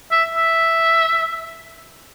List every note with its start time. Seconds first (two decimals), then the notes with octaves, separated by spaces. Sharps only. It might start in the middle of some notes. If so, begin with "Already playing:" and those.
0.12 E5
0.35 E5